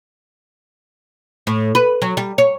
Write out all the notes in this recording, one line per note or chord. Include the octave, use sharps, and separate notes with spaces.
A2
B4
F#3
G3
C#5